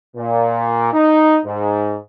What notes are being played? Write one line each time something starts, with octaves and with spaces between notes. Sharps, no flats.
A#2
D#4
G#2